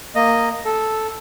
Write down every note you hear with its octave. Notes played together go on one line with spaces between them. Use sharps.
A#3 D#5
A4